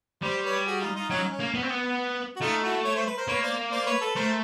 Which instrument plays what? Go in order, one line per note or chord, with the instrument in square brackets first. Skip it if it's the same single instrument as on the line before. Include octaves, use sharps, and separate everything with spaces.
[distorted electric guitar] G3 [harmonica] C5 D5
[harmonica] B4 C#5
F#4 G#4
D#4 F4
D#4 F4
[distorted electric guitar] F#3 [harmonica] C#4 D#4
[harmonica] C#4
[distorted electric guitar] A#3
B3
C4
B3
[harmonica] F#4
[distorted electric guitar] A3 [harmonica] D#4 F4
[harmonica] E4 F#4
C#5
C5
B4
A#4 C5
[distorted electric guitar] A#3 [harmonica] B4 C#5
[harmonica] C5 D5
C5 D5
B4 C#5
A4 B4
[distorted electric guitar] A3 [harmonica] A#4 C5